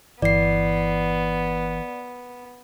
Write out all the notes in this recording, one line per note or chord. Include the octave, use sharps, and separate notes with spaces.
G1 E3 B3 D5 C7